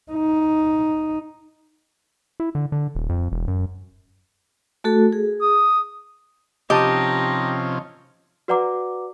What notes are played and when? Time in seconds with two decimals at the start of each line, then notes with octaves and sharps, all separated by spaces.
0.12 D#4
2.40 E4
2.55 D3
2.72 D3
2.95 D#1
3.09 F2
3.32 E1
3.48 F#2
4.84 A3 F#4 A4
5.13 G#4
5.41 D#6
6.70 C3 F3 C#4 D#4 G4 D#5 A5 D#6
8.48 F#4 B4 D5 F#5 A#5 D6